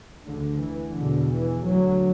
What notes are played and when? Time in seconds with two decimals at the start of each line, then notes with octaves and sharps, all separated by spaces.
0.25 D2 D3
0.59 E3
0.94 E2 B2 D3
1.29 E3
1.63 D2 F#3